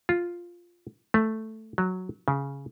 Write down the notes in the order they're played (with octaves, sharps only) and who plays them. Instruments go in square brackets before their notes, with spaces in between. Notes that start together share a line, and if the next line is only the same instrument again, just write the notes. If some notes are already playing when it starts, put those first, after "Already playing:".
[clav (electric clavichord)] F4
A3
F#3
C#3